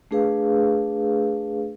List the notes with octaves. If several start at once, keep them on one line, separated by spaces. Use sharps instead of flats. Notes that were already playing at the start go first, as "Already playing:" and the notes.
A3 D4 G#4 B4 F5